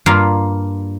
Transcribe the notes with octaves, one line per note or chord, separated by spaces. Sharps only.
G2 A#3 F4